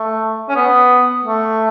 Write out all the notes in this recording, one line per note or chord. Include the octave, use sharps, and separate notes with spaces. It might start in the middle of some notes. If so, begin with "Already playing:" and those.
Already playing: A3
C#4
B3
A3